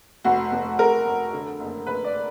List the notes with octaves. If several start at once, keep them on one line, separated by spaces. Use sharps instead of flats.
F1 F#4
F1
F1 A#4
F1
D3
F#1
F#1 B4
D5